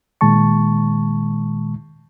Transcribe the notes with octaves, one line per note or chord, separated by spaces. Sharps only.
A#2 D#3 G#3 A5 C#6